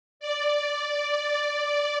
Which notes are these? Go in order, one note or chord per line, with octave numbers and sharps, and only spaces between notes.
D5
D5